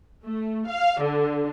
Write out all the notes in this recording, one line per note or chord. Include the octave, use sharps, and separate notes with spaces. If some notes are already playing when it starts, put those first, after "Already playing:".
A3
F5
D3